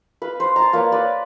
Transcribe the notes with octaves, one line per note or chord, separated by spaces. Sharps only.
B4 F5
C5
A5 A#5
A#3 B4 C#5 D5
B4 D5